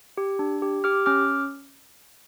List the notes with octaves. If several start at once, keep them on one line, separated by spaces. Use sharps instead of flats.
G4
D4
G4
G4 D6 F6
C#4 D6 F6